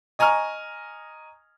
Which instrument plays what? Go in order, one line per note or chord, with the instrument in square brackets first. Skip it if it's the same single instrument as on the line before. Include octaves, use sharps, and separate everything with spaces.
[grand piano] D#5 G#5 A#5 C#6 F6